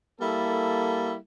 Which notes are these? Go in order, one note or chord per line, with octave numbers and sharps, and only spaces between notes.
G3 A#3 E4 A4